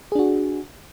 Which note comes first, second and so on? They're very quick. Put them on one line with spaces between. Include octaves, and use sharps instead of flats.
G#4 D4 F#4